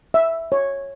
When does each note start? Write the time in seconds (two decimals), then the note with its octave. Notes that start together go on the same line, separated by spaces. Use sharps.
0.14 E5
0.52 C#5